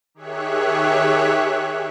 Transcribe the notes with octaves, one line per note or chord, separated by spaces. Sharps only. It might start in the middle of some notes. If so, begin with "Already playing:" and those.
D#3 G4 G#4 C#5 E5 F#6